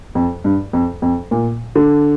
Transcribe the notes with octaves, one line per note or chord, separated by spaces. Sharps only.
F2
G2
F2
F2
A#2
D3